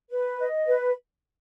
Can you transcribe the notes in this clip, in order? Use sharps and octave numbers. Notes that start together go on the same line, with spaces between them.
B4
D#5
B4